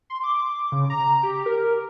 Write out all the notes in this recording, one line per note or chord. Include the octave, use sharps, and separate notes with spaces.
C6
D6
C#3
A#5
G4
A#4